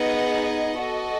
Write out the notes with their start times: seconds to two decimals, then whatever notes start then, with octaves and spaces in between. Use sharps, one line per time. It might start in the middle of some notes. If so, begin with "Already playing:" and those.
Already playing: B3 D#4 G#4 D#5 F#5
0.77 F#4 A4 D#5